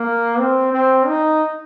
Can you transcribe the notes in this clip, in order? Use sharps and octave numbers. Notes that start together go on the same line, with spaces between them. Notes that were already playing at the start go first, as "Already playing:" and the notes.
Already playing: A#3
C4
C4
D#4